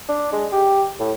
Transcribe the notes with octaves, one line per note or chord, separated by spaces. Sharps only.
D4
G#3
G4
A2